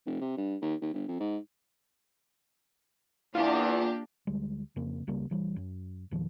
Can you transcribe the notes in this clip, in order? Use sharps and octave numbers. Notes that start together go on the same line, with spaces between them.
F1
C3
G2
D#2
D#2
G1
F2
G#2
E2 A#3 D4 E4 F4 G4
D2 G3 G#3
F2 C#3 A#3 C4
C#2 C#3 G3 A#3
A#1 E3 G3
F#2
E2 A#2 D#3 F3